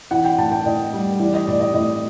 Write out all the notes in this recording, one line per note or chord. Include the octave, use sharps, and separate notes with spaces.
E3 F#5
G5
A2 A5
G5
A2 D#5
G3
E3 D5
D#5
A2 D5
D#5
A2 D#5